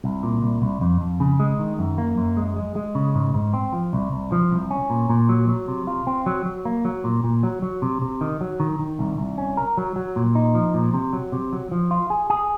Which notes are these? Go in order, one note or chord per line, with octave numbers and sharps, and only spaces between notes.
C2
A#2
C2
C2
F2
F2
C#3
G#3
D#3
F#2
A#3
F#2
G#3
G#3
G#3
C#3
G#2
G#2
C4
F3
C2
C2
F3
C2
C#4
A#2
A#2
F#3
F#3
C3
F4
C4
F#3
F#3
A#3
F#3
A#2
A#2
F#3
F#3
C3
C3
D#3
F#3
D#3
D#3
C2
C2
C#4
A#4
F#3
F#3
A#2
D#4
F3
A#2
C3
F#3
C3
F#3
F3
F4
G#4
G#4